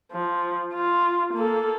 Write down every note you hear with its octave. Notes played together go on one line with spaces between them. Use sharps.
F3
F4
A#3 A4